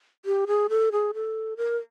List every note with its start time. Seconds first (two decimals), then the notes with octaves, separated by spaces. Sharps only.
0.25 G4
0.47 G#4
0.69 A4
0.92 G#4
1.14 A4
1.57 A#4